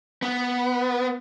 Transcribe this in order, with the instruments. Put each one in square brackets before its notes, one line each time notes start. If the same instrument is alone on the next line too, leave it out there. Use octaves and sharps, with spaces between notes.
[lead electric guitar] B3